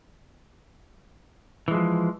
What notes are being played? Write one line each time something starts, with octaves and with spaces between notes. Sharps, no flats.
E3 F3 G#3